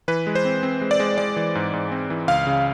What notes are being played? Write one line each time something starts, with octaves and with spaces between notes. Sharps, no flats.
E3 B4
G#3
C5
C4
C4
G#3
D5
G#3
G#3 D5
E3
G#2
G#2
C4
E3
C#2 F5
C#3